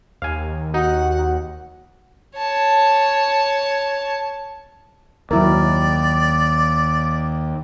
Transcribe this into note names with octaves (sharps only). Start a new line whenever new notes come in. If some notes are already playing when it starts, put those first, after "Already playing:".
D#2 F5 G#5
D#4 F#4 F#5
C#5 A5
D#2 F#3 E4 A#4 D5